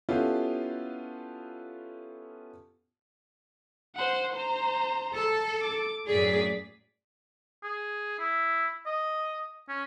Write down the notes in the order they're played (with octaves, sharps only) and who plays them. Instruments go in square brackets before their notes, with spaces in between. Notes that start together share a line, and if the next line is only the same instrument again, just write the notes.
[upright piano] B3 C#4 E4 F4 G4 A4
[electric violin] C5 F#5
C5 A#5
[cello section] A4
[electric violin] D6
[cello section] F#2 A2 G#4 [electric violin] D5 B6
[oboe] G#4
E4
D#5
C#4